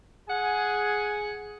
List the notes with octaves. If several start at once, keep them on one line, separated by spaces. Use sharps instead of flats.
G#4 F#5 G#5